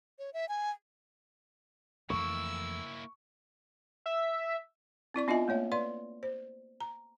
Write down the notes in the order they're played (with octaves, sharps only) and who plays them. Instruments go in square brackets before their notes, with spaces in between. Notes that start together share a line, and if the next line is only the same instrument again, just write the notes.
[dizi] C#5
E5
G#5
[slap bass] F2 E3 A3 [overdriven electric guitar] A#3 E4 [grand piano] C#6 [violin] E6
[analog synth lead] E5
[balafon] C4 E4 D5 C#6
B3 D4 F4 D#5 E5 G#5
A3 A#3 C#5 E5
B4 D5 F5 C6
C5
A#5